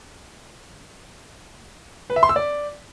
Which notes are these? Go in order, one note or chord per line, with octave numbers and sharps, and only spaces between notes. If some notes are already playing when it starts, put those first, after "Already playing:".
B4
E5
C6
E6
D5